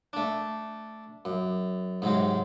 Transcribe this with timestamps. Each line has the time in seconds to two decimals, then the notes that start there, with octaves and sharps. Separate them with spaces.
0.13 A3 D4
1.25 F#2
2.02 G#2 C3 F#3 G#3